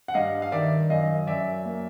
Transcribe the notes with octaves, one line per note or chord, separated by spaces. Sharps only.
F#5
G2 D#5 F5
F5
D#3 D5 E5
F#2 D#5 F5
F#2 D5 E5
A#3